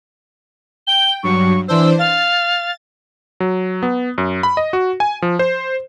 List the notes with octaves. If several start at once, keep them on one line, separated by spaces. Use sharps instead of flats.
G5 G7
G2 F#3 C#6
E3 D4 C5 E6
F5 A6
F#3
B3
F#2
B5
D#5
F#4
G#5
F3
C5